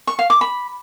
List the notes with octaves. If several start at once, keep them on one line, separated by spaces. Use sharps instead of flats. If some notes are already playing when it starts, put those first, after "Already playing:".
C#6
F5
D6
B5